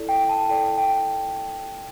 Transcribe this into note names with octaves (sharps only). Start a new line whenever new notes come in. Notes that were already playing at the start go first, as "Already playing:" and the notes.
Already playing: E4 A4 D5
G5
A5
E4 A4 D5 G5
G5